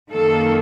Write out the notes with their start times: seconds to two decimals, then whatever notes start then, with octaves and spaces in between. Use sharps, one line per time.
0.13 F#2 D#3 A#3 A4